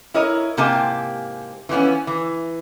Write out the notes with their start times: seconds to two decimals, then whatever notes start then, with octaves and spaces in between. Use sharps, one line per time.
0.14 E4 A#4 C#5 D#5
0.57 G#2 C3 A#3 G4 G#5 A5
1.69 E3 F3 G3 B3 C#4
2.07 E3